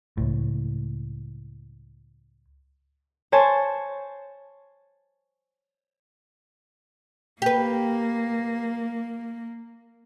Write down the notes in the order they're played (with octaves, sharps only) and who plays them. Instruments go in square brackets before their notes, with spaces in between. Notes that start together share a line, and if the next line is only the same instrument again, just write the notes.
[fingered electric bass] C#2 A2
[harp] C5 C#5 G#5 A5
[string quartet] A#3 [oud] G4 B4